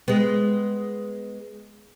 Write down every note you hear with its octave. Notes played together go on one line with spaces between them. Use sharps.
G#3 B3